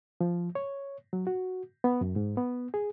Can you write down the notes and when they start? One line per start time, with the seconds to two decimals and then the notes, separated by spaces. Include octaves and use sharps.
0.21 F3
0.55 C#5
1.13 F#3
1.27 F#4
1.84 B3
2.01 F#2
2.16 G#2
2.37 B3
2.74 G#4